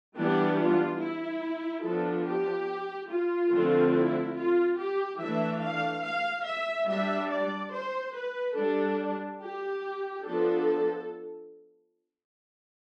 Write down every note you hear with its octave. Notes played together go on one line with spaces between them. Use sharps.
E3 G3 B3 D4 G4
F4
E4
F3 B3 D4 A4
G4
F4
D3 F3 A3 C4
E4
F4
G4
E3 A3 D4 E5
F5
F5
E5
G3 D4 E5
D5
C5
B4
G3 D4 A4
G4
F3 B3 D4 A4